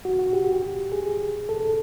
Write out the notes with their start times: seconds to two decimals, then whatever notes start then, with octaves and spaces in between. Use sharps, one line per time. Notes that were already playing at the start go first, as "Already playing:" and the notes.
0.05 F#4
0.19 F#4
0.33 G4
0.43 F#4
0.53 G4
0.92 G#4
1.49 A4